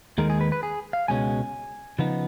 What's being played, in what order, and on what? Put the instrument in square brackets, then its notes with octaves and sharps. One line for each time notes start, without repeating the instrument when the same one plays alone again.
[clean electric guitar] D#2 D#3 G#3 A#4
G#4
B4
B4
G#4
F5
C#2 B2 G#3 C#4 G#5
C#3 F3 B3 D#4